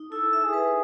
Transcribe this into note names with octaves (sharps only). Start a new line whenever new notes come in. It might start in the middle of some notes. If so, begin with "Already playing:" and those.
Already playing: D#4
E4 A4
E5
G#4
B4